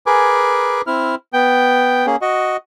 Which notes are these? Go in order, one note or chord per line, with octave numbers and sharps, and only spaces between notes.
G#4 A#4 B4 G#5 D6
C4 E4 F6
B3 G5
A#3 C#4 G#4
F#4 D#5